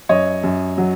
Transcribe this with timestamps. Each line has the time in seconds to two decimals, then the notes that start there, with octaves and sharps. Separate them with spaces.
0.09 F#2 C#5 D#5
0.43 F#2
0.78 F#3